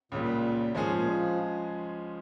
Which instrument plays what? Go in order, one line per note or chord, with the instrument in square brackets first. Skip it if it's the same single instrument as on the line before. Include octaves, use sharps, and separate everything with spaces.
[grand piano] C#2 C#3 G3 [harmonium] A#2
[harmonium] A#2 [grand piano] F3 G#3 C#4 G#4
[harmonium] G#2
A#2
F3